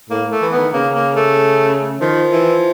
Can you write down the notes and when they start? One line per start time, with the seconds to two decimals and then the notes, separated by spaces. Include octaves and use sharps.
0.10 A2 A#3
0.32 A3
0.42 E3
0.52 B3
0.57 D#3
0.73 C#3 A#3
0.95 A#3
1.16 A3
2.01 D#3 F3
2.32 E3